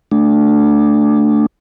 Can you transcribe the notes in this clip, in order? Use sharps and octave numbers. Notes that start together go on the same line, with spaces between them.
A3 D4